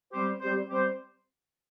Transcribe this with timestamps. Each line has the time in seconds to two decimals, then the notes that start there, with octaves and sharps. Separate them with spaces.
0.13 G3 C4 G4 C5
0.40 G3 C4 G4 C5
0.70 G3 C4 G4 C5